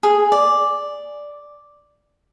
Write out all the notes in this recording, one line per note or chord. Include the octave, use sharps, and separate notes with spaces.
G#4
D5